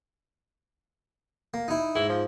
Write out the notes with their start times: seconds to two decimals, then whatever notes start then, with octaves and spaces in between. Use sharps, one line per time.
1.54 A#3
1.68 D#4 E4
1.96 G#2 E4
2.09 F3